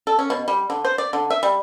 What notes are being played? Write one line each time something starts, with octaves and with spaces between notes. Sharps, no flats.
A4
C#4
B2
G3
D3
C5
D5
D3
E5
G3